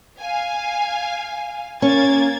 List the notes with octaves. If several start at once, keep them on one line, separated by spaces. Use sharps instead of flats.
F5 G#5
A#3 C#4 G#6 A6